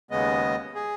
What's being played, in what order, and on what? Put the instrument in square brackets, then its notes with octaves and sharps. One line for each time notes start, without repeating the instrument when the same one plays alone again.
[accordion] D#2 C#3 G#3 B3 D#5
G#4